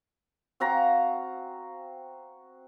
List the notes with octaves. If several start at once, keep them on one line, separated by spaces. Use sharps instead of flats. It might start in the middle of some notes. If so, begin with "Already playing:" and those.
C4 F#4 F5 A#5